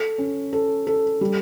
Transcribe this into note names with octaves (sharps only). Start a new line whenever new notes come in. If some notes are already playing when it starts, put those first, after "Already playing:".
Already playing: A4
C#4
A4
A4
G3